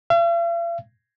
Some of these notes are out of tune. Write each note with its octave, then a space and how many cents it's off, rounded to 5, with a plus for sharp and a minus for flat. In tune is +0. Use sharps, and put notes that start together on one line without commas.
F5 -45